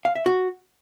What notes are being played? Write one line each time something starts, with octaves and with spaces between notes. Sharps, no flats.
F5
E5
F#4